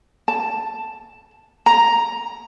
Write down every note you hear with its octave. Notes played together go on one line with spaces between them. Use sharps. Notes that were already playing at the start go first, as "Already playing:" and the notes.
A5
A#5